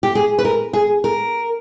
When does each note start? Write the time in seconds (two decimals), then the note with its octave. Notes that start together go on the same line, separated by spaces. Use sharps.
0.03 G4
0.15 G#4
0.38 B4
0.45 A#4
0.73 G#4
1.04 A#4